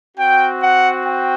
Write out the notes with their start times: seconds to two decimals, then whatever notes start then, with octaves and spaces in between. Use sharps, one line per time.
0.17 C4 F#4 G5
0.61 F#5
1.05 G5